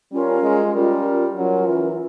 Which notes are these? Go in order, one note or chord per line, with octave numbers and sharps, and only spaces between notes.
G3 C#4 F4 A#4
G#3
G3 C#4 F4 A#4
F#3 C#4 F4 A#4
E3